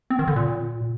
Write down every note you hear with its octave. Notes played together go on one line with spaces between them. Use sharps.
C4
D#3
D3
A#2